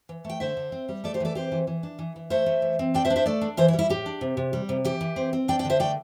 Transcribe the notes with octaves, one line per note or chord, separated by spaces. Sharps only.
E3
A3 G5
D3 C5 E5
D3
C4
G3
A3 A4 D5
G4 C5
E3 A4 D5
C4 G4 C5
E3
E3
D4
E3
E3
A3 C5 E5
A3
E3
C4
D4 D5 G5
C5 E5
D4
C5 E5
A3 A4 D5
D4
E3 C5 E5
E4
G3
E4
A2 G4
D4
C3
C3
G3
C3
E3 G4
E3
C4
C4
D4 D5 G5
D5 G5
D3
C5 E5
A3 D5 G5